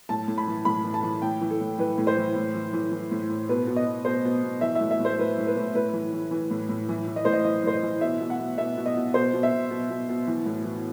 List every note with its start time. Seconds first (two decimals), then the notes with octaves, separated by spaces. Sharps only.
0.09 A2 A5
0.28 A2
0.38 B5
0.47 E3
0.65 A2 B5
0.84 E3
0.94 A5
1.03 E3
1.22 A2 G5
1.41 E3
1.50 A4
1.61 A2
1.79 E3 B4
1.98 A2
2.07 C5
2.17 E3
2.36 A2
2.55 E3
2.73 E3
2.92 E3
3.11 A2
3.29 A2
3.49 B2 B4
3.67 B2
3.76 D#5
3.86 B2
4.05 B2 C5
4.25 B2
4.43 B2
4.61 E3 E5
4.75 A2 E5
4.91 E5
5.00 A2 C5
5.18 A2 B4
5.38 A2
5.47 B4
5.57 A2
5.74 A2 B4
5.93 E3
6.13 E3
6.31 E3
6.51 A2
6.69 A2
6.89 E3
7.07 E3
7.16 D#5
7.25 A2 C5
7.33 D#5
7.45 E3 D#5
7.63 A2 C5
7.73 D#5
7.83 E3
8.01 B2 E5
8.20 B2
8.30 F#5
8.39 B2
8.58 B2 E5
8.77 B2
8.86 D#5
8.96 B2
9.14 B2 C5
9.33 B2
9.43 E5
9.52 B2
9.70 B2
9.90 B2
10.09 B2
10.27 E3
10.46 A2
10.65 E3